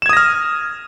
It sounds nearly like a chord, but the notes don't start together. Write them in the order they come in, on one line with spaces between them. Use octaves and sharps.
E7 G#6 D#6 A#6 F6